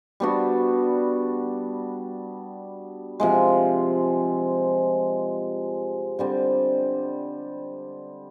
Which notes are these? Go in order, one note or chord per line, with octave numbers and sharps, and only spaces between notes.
G3 B3 D4 F#4
C3 F3 G#3
D3 G3 C4